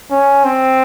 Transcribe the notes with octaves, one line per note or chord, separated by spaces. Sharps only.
C#4
C4